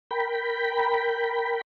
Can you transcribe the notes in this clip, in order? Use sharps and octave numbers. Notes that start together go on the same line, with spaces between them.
A#4 G5 B5